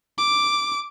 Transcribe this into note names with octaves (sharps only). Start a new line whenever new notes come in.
D6